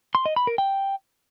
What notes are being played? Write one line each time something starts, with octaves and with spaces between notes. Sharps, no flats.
C6
D#5
B5
A#4
G5